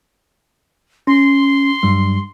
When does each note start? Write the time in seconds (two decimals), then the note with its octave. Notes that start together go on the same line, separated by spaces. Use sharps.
1.07 C#4 C6
1.83 G2 F#3 G3